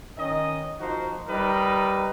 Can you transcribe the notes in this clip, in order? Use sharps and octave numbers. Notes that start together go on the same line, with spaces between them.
D#3 C#4 D#5
F3 D#4 F#4 A#4 C5
G3 D#4 A#4 B4 D#5